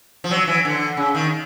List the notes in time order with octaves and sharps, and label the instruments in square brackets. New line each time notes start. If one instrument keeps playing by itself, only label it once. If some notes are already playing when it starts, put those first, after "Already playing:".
[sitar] F3
F#3
E3
D3
C#3
D#3